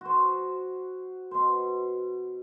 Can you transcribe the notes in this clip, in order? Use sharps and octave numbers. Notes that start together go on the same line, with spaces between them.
F#4 C5
B2 C5